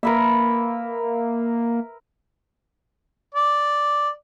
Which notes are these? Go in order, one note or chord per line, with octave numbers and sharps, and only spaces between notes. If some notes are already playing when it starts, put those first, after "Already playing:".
A#3 A#4 B4 E5
D5